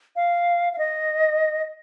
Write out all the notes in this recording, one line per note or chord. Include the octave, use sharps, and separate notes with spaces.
F5
F5
D#5